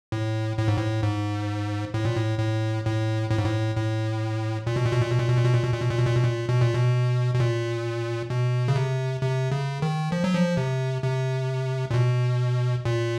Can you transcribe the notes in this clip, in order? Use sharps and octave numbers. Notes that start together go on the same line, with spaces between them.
A2
A2
G#2
A2
G#2
A2
A#2
A2
A2
A2
A2
G#2
A2
A2
A#2
B2
A#2
B2
A#2
B2
A#2
B2
A#2
B2
A#2
B2
A#2
B2
A#2
B2
A#2
B2
A#2
B2
A#2
B2
B2
A#2
B2
C#3
C3
C3
C#3
D#3
F3
F#3
F3
C3
C3
A#2
B2
A#2